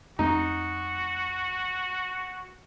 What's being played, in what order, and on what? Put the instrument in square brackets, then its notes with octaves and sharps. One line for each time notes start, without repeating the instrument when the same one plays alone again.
[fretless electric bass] F2 A3 [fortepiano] D#4 [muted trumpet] F#4